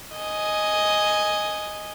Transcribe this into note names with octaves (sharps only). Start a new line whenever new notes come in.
D#5 G#5